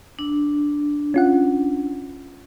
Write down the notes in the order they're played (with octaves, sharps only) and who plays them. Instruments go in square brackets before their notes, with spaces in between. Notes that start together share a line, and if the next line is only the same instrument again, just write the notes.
[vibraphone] D4
[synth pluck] C#4 F4 F#5